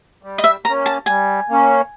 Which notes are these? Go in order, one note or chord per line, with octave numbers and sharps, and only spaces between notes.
G3
D#5
E5
A#3 C#4 A#5
A5
G3 G#5
A#3 C#4